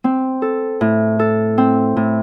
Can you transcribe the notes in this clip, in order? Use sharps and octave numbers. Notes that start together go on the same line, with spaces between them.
C4
A4
A2
A4
C4
A2